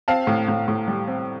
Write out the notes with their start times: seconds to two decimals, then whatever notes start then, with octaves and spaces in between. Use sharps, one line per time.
0.08 C4 F5 A5
0.27 A2
0.48 A2
0.68 A2
0.88 G3
1.08 C4